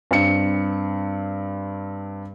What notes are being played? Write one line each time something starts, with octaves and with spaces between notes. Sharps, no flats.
G2 C4 C#7